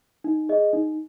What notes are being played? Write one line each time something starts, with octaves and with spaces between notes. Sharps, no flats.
D#4
G#4 D#5
D#4